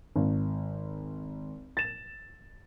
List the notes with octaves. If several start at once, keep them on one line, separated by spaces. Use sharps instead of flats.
G#1
A6 E7